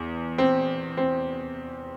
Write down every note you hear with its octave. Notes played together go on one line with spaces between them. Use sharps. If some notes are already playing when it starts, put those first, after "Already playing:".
Already playing: E2
C4
C4